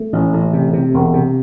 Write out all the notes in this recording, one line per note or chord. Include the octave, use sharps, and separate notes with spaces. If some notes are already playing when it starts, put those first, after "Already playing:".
Already playing: A3
A1
A1
C3
C3
E1
C3